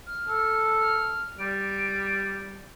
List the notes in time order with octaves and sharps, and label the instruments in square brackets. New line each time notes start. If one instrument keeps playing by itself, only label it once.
[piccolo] F6
[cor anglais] A4
[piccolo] F6
[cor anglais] G3 [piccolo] D7